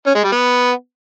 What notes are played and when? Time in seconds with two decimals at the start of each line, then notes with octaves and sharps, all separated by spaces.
0.06 C#4
0.15 G#3
0.24 G3
0.32 B3